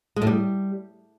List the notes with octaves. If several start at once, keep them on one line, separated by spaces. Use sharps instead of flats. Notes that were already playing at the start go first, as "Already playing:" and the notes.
G#3
A2
G3